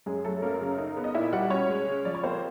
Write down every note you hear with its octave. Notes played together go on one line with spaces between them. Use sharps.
F#2 G#3 G#4
F#3 A3 A4
F#2 A#3 A#4
C#3
D#4
B3
D#5
A#2 E4 E5
G3 F#4 F#5
C#4 C#5
G#3
C#3
F3 D5
C#5
A#3 C4 C5